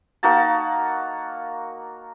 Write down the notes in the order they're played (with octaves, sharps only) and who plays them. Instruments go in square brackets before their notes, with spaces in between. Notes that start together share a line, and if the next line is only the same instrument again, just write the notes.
[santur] A#3 D#4 F#4 A5